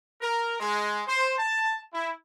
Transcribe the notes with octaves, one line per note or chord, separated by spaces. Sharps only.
A#4
G#3
C5
A5
E4